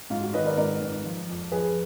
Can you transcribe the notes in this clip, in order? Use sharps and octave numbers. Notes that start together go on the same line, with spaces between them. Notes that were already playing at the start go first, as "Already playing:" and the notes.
G#2 F4
F#4
D#3 B4 D#5
A#4 D5
G#2 A#4 D5
G#2
F3
F2
F3 G#4 B4